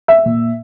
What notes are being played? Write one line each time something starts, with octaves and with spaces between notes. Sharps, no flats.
E5
A#2